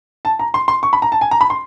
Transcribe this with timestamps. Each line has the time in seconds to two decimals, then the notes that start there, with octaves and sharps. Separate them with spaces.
0.25 A5
0.39 A#5
0.54 C6
0.68 C6
0.83 C#6
0.93 B5
1.02 A#5
1.12 A5
1.21 G#5
1.31 A#5
1.41 B5
1.50 C6